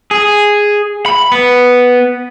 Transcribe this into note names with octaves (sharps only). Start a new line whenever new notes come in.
G#4
B5
B3